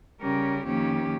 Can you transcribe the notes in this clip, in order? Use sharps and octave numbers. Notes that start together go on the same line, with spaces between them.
C#3 G3 C#4 G4 A#4
F2 D#3 A#3 C#4 G4